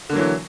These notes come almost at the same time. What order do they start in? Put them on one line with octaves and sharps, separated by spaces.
D3 A#3 F#3 E3